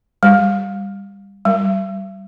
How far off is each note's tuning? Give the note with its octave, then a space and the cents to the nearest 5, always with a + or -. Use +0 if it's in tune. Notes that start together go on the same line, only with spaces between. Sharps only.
G3 +20
G3 -20